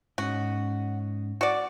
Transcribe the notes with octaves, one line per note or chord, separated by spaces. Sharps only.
G#2 C#4 D#4 F#4
F#4 D5